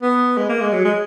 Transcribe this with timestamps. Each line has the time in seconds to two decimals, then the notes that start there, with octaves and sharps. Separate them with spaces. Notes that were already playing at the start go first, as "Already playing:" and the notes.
0.02 B3
0.38 G#3
0.49 A#3
0.61 G#3
0.73 F#3
0.85 G#3